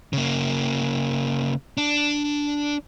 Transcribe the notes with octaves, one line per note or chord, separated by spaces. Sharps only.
C#3 A#3
D4